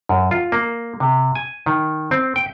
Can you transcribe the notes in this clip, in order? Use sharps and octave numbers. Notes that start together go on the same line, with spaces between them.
F#2
F4
A#3
C3
G#5
D#3
C4
G5